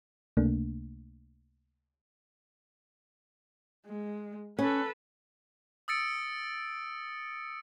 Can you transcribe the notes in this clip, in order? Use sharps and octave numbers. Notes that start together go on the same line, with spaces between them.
C#2 C3 A3 A#3 D4
G#3
C#4 A4 B4
D#6 E6 A6 C#7 D7